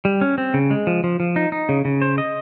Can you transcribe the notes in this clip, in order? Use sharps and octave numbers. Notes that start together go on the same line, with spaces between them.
G3
C#4
C4
C#3
G#3
F3
F3
F3
D#4
D#4
C#3
C#3
C5
D#5